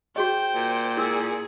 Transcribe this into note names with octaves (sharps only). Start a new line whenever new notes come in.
F#4 G#4 C5 D#5 G5
A#2
E4 G#4 A#4 E6